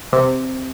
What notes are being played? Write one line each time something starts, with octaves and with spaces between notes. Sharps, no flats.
C3